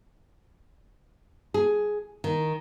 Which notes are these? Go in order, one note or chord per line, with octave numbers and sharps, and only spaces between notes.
G#4
D#3